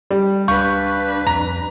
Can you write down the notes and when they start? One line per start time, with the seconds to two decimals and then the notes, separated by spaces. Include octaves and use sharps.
0.10 G3
0.48 C#2 D4 B4 F5 C#6 G6
1.27 F2 A#5